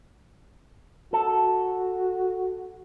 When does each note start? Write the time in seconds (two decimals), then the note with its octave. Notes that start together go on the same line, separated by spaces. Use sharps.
1.13 F#4 A4